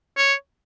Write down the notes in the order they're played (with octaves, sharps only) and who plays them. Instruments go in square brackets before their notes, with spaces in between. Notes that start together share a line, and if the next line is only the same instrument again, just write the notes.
[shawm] C#5